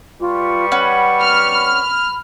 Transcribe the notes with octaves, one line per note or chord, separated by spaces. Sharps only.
G3 F4 B4 C#6
C#4 F#5 B5
F6
B5